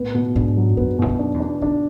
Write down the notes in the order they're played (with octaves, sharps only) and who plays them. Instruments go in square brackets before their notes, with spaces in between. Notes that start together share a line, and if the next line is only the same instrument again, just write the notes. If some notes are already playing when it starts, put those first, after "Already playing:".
Already playing: [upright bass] A2 [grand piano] B3
[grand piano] B2
[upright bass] G#2 [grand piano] D4
[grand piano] F#3
[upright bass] F#2 [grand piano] B3
[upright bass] G#2 [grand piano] B2
[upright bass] F#2
[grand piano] D4
[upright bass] E2
[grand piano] D4
[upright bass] D3 [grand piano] D4